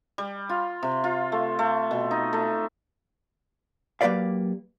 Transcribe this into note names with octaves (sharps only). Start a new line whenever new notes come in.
G3
F4
C3
F4
A3
A3
B2
D#4
A3
F#3 A#3 G4 B4 D5 F5